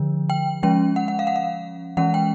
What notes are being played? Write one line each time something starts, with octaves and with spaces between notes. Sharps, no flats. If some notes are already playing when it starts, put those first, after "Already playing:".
Already playing: D3 F3
G5
F3 G#3 C#4 G5
F#5
F#5
F5
F#5
F5
E3 G#3 C#4 F#5
G5